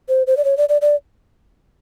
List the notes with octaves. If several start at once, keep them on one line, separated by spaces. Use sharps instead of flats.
C5
C5
D5
C#5
D5
D5
D5